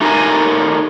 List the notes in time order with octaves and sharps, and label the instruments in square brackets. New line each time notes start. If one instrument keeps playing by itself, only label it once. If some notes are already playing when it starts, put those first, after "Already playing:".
[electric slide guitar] A3 D#4 G4 A4 A#4 G#5